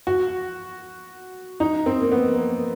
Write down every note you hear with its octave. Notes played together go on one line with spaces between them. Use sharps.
F#4
D#4
C4
A#3
B3
A#3